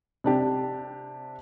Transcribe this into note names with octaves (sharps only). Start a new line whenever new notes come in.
C3 D4 G4